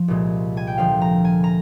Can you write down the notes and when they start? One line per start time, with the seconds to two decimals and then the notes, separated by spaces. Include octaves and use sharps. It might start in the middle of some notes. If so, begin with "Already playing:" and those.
Already playing: F3
0.08 C2 A#2 G#3
0.57 G#5
0.67 G5
0.78 D2 D3 F3 F5
1.01 A#5
1.25 G#5
1.44 A#5